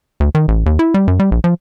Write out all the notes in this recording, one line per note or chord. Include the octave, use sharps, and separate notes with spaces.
D2
D#3
A1
D#2
E4
G3
F#2
G3
A#1
F3